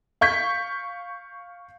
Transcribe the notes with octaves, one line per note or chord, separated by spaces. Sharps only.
F5 C#6 G6 B6